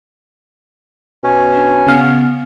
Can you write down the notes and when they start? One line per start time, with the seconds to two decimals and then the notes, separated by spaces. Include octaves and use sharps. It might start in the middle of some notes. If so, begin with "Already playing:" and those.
1.24 B2 C#4
1.54 D4
1.86 C#3 B3 F5